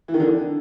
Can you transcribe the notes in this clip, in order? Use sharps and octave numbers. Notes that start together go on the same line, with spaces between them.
E3
D#3
D3